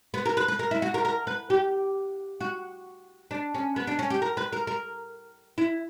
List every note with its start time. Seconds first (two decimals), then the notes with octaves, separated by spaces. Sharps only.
0.14 B3
0.26 A#4
0.37 B4
0.48 B4
0.59 A#4
0.71 E4
0.82 F#4
0.94 A#4
1.05 A#4
1.27 B4
1.50 G4
2.41 F#4
3.31 D4
3.55 C#4
3.76 B3
3.87 D4
3.99 C#4
4.10 G4
4.22 A#4
4.37 B4
4.52 A#4
4.67 A#4
5.58 E4